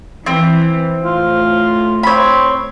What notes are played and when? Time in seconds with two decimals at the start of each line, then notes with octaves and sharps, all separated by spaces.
0.26 E3 C4
1.05 A2 F4
2.03 C4 C#5 B5